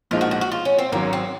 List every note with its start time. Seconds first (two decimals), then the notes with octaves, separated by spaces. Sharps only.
0.11 A#1 A#2 F3 G#3 D#4 F4
0.21 F#4
0.31 F#4
0.41 F#4
0.52 F4
0.65 C#4
0.79 C4
0.92 G#1 G#2 F#3 A#3 C#4
1.13 C4